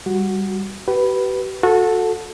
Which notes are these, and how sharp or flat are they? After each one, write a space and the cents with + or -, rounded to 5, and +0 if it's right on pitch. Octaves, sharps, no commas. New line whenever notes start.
G3 +0 F#4 +0
G4 -40 B4 +0
F#4 -25 A4 +0